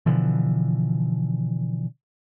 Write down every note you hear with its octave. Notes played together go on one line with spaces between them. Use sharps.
B2 D3 E3 F3